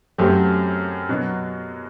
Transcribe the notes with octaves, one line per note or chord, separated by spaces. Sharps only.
F#2 F#3 A3 C4 G4
B2 F#3 B3